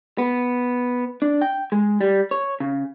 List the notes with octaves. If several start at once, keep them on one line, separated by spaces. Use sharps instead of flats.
B3
D4
G5
G#3
G3
C#5
C#3